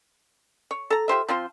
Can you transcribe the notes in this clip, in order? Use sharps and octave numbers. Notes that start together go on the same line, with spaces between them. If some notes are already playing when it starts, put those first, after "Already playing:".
C#5
A4 A#5
F4 G4 C5 E5
F3 C4 F4 C5